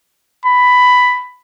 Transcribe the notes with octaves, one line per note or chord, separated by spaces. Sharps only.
B5